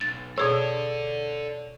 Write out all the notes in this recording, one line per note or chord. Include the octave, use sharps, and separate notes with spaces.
B1 A6
B2 G#4 A4 C#5 D5 E6